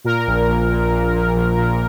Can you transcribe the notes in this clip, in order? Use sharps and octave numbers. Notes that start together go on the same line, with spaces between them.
A#2 A#4
A#1
A#1
A#2
A#2
A#2
A#1
A#2